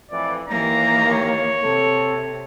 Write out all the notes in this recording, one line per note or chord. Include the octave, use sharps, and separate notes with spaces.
F2 A2 E3 D5
D#2 E3 A#3 A#5
C#5
C3 A4